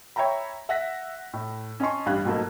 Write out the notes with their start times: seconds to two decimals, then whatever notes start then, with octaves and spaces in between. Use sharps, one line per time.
0.16 C#5 E5 G5 A#5 B5
0.69 E5 F#5 F#6 A#6 B6
1.33 A2
1.80 C#4 D#5 G#5 A5 C6 C#6
2.06 A1 G2 F5 B5 F#6 G#6
2.25 G#2 B2 F#3 A3 A#3